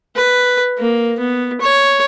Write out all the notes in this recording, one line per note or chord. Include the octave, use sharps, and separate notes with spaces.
B4
A#3
B3
C#5